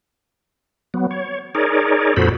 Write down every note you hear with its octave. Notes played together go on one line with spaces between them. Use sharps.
F#3 B3
C#5
D#4 G#4 A#4 C#5 D5
F2 A#2 F#4 A4 C5 B5